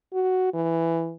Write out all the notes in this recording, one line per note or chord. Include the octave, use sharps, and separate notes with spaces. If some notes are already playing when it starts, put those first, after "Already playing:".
F#4
E3